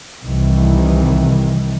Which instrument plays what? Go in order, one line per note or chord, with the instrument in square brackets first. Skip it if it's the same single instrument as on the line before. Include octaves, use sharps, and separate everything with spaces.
[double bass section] C2 D#3 E3